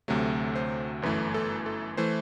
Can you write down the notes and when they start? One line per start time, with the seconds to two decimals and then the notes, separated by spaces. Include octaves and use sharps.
0.08 D2 C3 F#3 A3
0.56 C5
1.02 G1 F#2 E3 A3 B4
1.34 A4
1.66 A4
1.97 E3 A3 C5